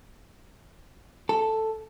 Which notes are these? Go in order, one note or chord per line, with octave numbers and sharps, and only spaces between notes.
A4